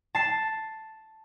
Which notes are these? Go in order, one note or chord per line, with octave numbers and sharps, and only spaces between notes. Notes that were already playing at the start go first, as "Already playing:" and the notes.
A5 C7